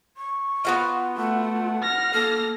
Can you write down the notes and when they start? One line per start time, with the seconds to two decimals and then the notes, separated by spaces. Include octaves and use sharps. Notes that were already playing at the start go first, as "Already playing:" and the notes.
0.17 C#6
0.65 B3 F4 F#4 F5
1.17 A3 F#5
1.83 F6 A#6
2.14 A#3 A4